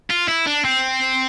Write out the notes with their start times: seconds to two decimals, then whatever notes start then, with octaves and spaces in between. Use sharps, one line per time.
0.10 F4
0.28 E4
0.47 D4
0.65 C4